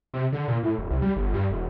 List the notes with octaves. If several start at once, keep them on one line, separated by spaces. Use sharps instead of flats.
C3
D3
A#2
A2
D#1
C2
G3
G1
G2
E1